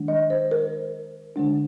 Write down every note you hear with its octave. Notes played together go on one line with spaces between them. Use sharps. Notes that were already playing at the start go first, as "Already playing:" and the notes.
Already playing: D#3 G#3 D4
D#5
C5
A#4
D3 G#3 D4